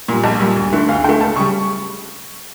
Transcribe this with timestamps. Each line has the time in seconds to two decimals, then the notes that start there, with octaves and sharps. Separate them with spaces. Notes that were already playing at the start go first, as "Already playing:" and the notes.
0.08 A#2 G3
0.24 A#1 A5
0.40 A#2 G3
0.56 D2
0.72 D3 A3
0.88 D2 F5
1.04 D3 G5
1.09 A3
1.20 C#2 A5
1.36 C#3 G3 C#6